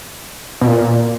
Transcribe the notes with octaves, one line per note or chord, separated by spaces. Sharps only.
B2
A#2